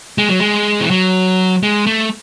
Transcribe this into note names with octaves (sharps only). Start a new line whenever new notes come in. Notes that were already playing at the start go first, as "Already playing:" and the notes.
G#3
F#3
G#3
E3
F#3
G#3
A3